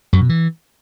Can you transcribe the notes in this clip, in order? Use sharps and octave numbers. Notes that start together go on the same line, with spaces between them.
F#2
B2
E3